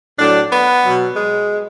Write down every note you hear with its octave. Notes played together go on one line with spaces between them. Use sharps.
A2 F#3 D4
B3
B2 F#3
G#3